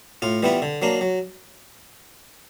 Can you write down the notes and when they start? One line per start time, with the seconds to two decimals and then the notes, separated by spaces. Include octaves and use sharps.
0.22 A2 F4
0.43 E3 G3 B3 E4
0.62 D3
0.82 F#3 A#3 D4
1.01 F#3